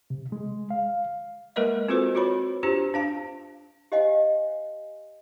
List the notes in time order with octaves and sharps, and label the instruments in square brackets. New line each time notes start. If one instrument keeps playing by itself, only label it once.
[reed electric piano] C3
G#3
F5
[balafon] G#3 A#3 A#4 B4 D#5 E5
C4 F4 F#4 A4 B4 C5
F4 F#4 B4 C#5 B5
D4 F4 G4 C5 A#5
D4 F5 A5
[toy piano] G4 C5 D#5 F5 F#5 G#5